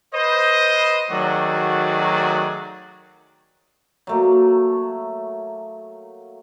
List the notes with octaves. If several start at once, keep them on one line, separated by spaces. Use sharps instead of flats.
B4 C5 D#5
D#3 F#3 A3 F#4 G#4 D5
F#3 A3 A#3